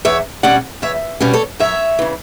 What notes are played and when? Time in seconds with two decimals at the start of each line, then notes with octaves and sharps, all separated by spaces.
0.05 E2 C#5 E5
0.43 B2 G3 C#4 D5 F#5
0.82 E2 C#5 E5
1.20 B2 G3 C#4
1.33 A4 C#5
1.60 F#2 C#5 E5
1.99 C#3 E3